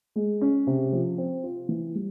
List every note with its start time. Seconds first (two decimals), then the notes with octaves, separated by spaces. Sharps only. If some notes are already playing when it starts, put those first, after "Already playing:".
0.16 G#3
0.41 C#4
0.67 C3
0.93 F3
1.18 C4
1.43 F4
1.69 E3
1.95 G3